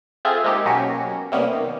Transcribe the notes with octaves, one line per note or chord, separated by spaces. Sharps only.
C4 F4 G#4 A4 E5
G#3 A#3 D#4 G4
B2 F#3 A#3 C#4 F#4 G4
C3 G3 A#3 B3 C#4
D#3